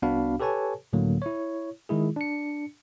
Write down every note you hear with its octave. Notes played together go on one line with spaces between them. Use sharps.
C2 B3 D4 F#4 F5 B5
G4 A4 B4 C#5 G#5 A5
C#2 A2 D3 F#3 A#3
E4 C#5
D#3 G#3 E4 G#4
D4 C#7